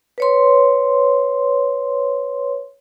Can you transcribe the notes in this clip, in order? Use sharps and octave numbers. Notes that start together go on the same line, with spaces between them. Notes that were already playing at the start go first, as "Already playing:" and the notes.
B4 C#5 C6